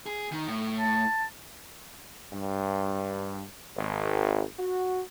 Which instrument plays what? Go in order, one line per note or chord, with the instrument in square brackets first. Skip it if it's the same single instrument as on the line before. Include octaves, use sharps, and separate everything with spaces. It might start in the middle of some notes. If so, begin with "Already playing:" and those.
[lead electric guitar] G#4
D#3
A2
[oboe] A5
[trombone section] G2
G#1
F#4